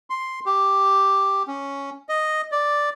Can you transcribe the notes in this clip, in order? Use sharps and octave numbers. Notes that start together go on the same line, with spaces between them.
C6
G4
C#4
D#5
D5